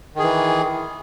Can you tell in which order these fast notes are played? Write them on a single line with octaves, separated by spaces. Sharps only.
D#3 G#4 E3